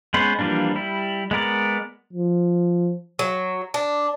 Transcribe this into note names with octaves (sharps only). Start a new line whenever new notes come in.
G#3 B3 C#4 B4 C5
E3 F3 G3 A#3 D4
G3 E4
G#3 B3 A#4 D5
F3
F#3
D4